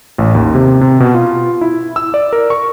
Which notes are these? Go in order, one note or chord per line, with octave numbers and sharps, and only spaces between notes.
A1
D#2
C3
C3
B2
F4
E4
E6
D5
A#4
C#6